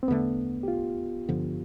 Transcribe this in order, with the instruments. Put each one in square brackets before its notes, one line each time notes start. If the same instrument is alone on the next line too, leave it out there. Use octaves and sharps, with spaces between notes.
[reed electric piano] C4
[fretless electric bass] E2 D3 A3 [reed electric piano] B3
[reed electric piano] G4
F4
[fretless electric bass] G2 D3 F3 B3